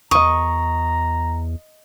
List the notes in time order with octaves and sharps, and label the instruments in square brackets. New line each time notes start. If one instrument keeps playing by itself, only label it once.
[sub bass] E2 [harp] D#5 D#6 [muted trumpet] A#5 [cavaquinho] C#6